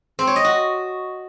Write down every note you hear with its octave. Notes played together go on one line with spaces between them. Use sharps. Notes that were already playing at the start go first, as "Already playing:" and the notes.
C4
C#5
D#5
F#4